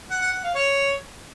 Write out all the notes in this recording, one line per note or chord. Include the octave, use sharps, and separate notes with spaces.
F#5
F#5
F#5
F5
C#5